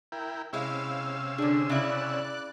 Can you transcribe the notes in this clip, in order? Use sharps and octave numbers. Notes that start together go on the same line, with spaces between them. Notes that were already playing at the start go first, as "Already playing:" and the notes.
E4 A#4 G5
C3 G#3 C#4 E4 F5 E6
D3 D4 G#4
C#3 E4 D5 F#6